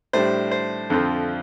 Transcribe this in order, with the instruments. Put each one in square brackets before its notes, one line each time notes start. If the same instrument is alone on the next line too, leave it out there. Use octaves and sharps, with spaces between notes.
[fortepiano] A2 G3 D4 C5
C5
F2 D3 F3 C4